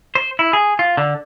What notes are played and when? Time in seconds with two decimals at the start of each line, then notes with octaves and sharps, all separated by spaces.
0.15 C5
0.39 E4
0.53 G#4
0.79 F4
0.97 D3